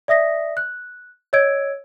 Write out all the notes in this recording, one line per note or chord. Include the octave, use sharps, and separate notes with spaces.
D5 E5 D#6 A#6 B6
F#6
C#5 D#5 E6 G#6 D7